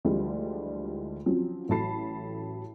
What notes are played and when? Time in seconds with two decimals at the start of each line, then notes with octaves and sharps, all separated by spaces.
0.05 D2 D3 E3 F3 G3 G#3
1.26 F3 F#3 C4 C#4
1.69 A1 F#3 A4 A5 B5 C7